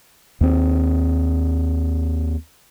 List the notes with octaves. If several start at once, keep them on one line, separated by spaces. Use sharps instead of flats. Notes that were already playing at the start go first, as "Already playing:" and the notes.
D#2 C4